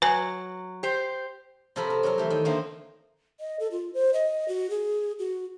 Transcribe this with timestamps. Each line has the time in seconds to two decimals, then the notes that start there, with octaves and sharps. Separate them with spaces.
0.02 F#3 B4 G#5
0.83 G4 C5
1.76 C3 F3 A4 A#4 B5
1.90 A#4
2.03 F#3 F#4 A4 A#4
2.18 E3 A3 G4
2.30 D#3
2.45 D3 F3 A3 A#3 C4
3.40 D#5
3.60 A4
3.71 F4
3.94 C5
4.14 D#5
4.48 F#4
4.70 G#4
5.19 F#4